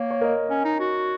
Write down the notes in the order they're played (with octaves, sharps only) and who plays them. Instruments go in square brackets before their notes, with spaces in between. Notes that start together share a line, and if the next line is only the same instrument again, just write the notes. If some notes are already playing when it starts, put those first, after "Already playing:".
Already playing: [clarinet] A#3 [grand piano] C#5
[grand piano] C#5
A#4 D#5
[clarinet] C#4
D#4
F#4